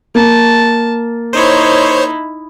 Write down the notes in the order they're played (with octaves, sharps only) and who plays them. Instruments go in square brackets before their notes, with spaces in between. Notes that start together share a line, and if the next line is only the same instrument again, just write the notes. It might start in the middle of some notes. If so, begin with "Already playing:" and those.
[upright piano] A#3 [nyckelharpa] A5
[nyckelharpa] D#4 E4 [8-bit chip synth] C5 C#5